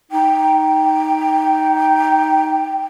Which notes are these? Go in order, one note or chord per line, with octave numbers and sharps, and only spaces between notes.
D#4 G5